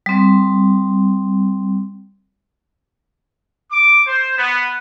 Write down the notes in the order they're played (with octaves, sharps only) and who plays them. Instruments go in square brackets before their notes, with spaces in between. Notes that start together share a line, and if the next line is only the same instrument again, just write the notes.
[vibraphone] G3 C4
[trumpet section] D6
C5
B3